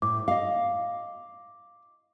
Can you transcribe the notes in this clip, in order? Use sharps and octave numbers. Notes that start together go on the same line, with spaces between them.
A2 D6
D#5 F5